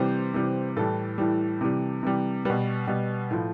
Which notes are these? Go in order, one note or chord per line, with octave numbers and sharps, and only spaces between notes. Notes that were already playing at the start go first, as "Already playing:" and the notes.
Already playing: C3 E3 G3 C5
C3 E3 G3
A2 E3 G3 A4
A2 E3 G3
C3 E3 G3
C3 E3 G3
B2 G3 B4
B2 G3
A2 F3